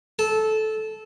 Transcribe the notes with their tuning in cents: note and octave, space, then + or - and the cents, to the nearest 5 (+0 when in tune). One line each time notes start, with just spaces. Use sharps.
A4 -15